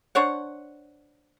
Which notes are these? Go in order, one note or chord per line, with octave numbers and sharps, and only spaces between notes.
D4 C5 C#5 F#5